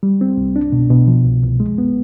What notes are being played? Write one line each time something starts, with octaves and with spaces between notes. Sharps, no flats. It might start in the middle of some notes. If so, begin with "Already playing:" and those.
G3
C4
C2
D4
B2
B2
F3
C2
C2
G#3
B3